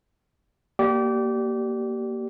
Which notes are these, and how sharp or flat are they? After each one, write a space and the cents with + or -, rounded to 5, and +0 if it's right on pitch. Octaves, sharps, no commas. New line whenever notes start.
A#3 +0 G4 -25 D5 +0